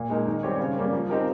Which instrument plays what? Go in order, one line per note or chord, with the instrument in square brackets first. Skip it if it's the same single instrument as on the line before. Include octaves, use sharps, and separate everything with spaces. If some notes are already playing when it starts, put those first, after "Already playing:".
Already playing: [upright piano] A#2
G#3 D#4 A#4
D#3
G3 C4 G4 C#5
C#3
G3 A#3 C#4
F3
C4 D#4 G4 A#4